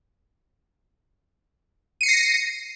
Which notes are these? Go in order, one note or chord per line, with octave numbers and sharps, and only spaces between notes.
A#6 C7 C#7 D#7